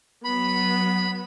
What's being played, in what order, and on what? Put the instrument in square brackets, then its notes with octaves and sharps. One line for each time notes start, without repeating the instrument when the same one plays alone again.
[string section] F#3 B3 [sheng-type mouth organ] B5